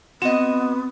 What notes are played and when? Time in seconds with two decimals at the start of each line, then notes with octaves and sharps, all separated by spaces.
0.22 B3 C4 F#4 D#5